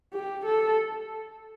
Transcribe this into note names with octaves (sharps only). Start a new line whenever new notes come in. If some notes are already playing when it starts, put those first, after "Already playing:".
G4
A4